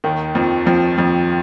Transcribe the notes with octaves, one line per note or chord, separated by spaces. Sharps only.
D#2 D#3
F2 F3
F2 F3
F2 F3